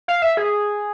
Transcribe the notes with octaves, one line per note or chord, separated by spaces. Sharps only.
F5
E5
G#4